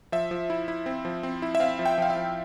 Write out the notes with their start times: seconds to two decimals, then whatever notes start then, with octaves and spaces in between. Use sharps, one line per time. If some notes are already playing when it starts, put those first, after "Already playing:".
0.12 F3 E5
0.31 F3
0.50 E4
0.68 E4
0.86 C4
1.05 F3
1.23 C4
1.42 E4
1.55 E5
1.60 C4 F5
1.79 F3
1.85 G5
1.98 F3 F5
2.10 E5
2.16 F3